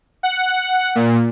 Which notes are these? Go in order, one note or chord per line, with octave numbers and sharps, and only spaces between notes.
F#5
A#2